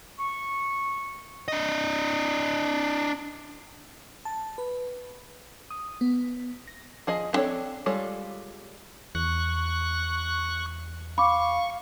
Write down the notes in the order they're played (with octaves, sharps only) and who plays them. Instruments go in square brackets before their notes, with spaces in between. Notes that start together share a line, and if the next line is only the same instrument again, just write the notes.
[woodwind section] C#6
[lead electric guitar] D4 D#5
[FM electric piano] A5
B4
D#6
B3
A#6
[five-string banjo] F3 G#4 D#5
B3 C4 D4 A4 C#5
G3 G#3 F4 A4 C#5
[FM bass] E2 [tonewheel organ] C#6 F#6
[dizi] F5 [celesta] B5 D6 [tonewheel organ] C#6